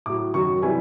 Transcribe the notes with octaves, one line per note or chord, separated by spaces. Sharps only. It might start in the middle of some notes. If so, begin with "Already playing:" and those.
A2 F#3 D6
F#2 D#3 F#3 C#6
C3 E3 G3 G#5